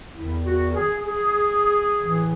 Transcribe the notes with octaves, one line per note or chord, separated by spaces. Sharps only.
E2 D#3 E4
F#4
G#4
G#4
A2 E3